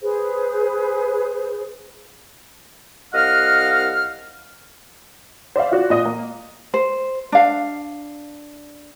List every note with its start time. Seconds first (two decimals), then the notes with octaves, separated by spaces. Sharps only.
0.02 G#4 B4 C5
3.14 C2 D#5 F5 F#5 F6
5.56 C5 D5 E5 F5
5.72 F4 F#4 D5
5.90 A#2 D#5 D#6
6.05 A#3
6.74 C5
7.32 D4 F5